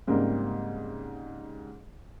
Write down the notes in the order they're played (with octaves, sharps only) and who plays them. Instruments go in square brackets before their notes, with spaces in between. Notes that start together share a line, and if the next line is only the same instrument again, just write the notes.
[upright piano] G#2 C#3 G3 A#3 C4